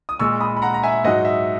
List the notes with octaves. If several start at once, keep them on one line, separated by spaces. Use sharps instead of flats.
D#6
A#2 G#3 C#6 E6
B5 D#6
B5
F#5 A#5
A#5
E5 G#5
G#2 F#3 D#5 F#5
E5